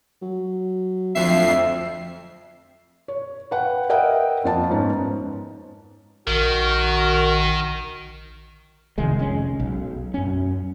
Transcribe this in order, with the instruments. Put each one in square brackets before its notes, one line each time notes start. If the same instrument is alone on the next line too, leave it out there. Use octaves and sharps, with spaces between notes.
[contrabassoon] F#3
[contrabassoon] D1 [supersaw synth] F2 C7 [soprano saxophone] E5
[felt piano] C#5
B4 F#5 G5
A#4 D#5 E5 F#5 G5
F2 A#3 F4 D#5 A5
G#2 B3 C#4 D#4
[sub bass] A#1 [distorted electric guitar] D#3 [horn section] F#4 A#4
[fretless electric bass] F1 C2 D#3 G#3
F1 G#3 C#4
B1
F#2 C#4